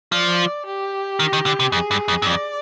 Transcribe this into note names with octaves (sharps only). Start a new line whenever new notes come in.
F3 D5
G4
D#3
D#3
D3
C3
F2 G#4
G2
F2
G2
F2 D5